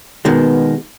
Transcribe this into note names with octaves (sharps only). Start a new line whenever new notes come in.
B2 D#3 G#3 B3